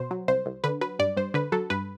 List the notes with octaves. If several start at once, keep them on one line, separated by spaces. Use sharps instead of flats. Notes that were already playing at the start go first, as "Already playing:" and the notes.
Already playing: B2 C5
F#3
C2 C5
C2
D3 B4
F#3 B4
G2 D5
G2 C5
D3 B4
F#3 A4
G2 B4